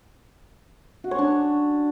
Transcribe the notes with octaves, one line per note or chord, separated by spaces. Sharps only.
F#4
C#5
D4